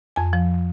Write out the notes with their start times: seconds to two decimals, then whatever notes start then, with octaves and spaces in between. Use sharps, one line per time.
0.16 F2 G#5
0.33 F3